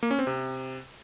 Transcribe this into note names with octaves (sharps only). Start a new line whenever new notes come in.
A#3
C#4
C4
C3